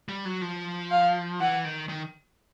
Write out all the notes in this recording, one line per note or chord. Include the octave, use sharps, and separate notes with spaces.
G3
F#3
F3
F5
E3 F#5
D#3
D#3